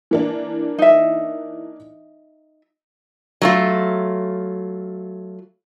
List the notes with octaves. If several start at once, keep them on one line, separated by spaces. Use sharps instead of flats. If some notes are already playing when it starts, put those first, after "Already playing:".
E3 A#3 D4
D#4 E5
F#3 A3 F4